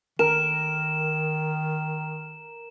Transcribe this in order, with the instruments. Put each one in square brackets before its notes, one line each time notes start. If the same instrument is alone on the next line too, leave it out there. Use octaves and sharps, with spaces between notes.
[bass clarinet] D#3 [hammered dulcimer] A#4 [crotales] E7